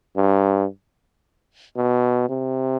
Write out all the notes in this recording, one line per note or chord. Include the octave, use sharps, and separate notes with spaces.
G2
B2
C3